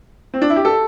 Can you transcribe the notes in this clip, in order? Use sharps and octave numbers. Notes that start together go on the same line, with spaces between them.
C4
D4
E4
G4
A4